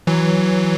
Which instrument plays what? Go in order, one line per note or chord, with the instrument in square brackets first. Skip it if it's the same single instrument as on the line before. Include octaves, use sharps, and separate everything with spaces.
[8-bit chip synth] E3 F#3